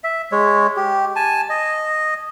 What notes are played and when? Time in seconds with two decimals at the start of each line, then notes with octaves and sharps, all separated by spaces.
0.04 E5
0.32 G#3 C#5
0.76 G4
1.16 G#5 A5
1.49 D#5